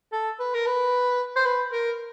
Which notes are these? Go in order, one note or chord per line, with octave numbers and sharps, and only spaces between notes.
A4
B4
A#4
B4
C5
B4
A#4